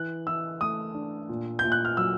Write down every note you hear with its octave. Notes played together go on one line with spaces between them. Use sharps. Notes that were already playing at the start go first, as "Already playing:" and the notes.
Already playing: E3 F#6
E3 E6
A3 D#6
D4
A#2
G6
A#2
F#6
F6
F#3 E6